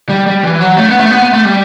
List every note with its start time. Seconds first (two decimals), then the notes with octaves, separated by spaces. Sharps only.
0.09 G3
0.26 G3
0.43 E3
0.60 F#3
0.78 A3
0.89 B3
1.00 A3
1.11 B3
1.22 B3
1.33 A3
1.45 G3